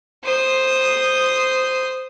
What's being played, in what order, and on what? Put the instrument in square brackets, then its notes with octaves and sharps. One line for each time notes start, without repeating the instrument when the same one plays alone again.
[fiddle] C5 D#6